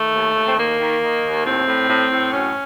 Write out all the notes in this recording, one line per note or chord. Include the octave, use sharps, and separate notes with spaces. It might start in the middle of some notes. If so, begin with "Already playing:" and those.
Already playing: D#3 A3
D#2
D#2
C4
D#3 A#3
D#3
D#3
D#2
A2 C4
A2
A2
A2
F#2 C#4